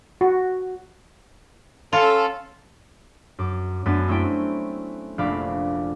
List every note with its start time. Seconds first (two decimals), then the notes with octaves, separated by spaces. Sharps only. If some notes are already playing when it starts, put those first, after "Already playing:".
0.21 F#4
1.93 C#4 F4 A4
3.39 F#2 D6
3.86 F#2 A3 B3 D4 D#6 A6
4.08 A3 C4 C#4 E4 G5
5.18 F1 A#1 D4 F5 B5 D6